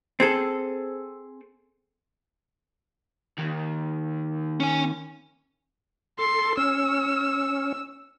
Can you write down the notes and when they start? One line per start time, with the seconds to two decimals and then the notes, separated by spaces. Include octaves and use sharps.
0.20 C4 G#4 A4
3.39 D#2
4.60 C#4 G#5
6.19 A4 C6
6.57 C#4 E6